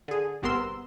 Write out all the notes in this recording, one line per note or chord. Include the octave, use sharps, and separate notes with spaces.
D3 G#4
G1 C3 B3 A#4 C6 E6